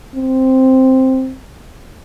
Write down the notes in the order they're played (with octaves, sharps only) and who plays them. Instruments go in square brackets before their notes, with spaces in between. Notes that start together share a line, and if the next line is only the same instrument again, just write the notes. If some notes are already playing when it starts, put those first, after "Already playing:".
[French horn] C4